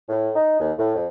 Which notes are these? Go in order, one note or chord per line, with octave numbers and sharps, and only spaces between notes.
A2
D#4
D#2
A2
F2